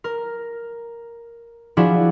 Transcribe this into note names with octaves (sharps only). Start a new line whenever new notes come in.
A#4
F3 D4 E4 F#4 G#4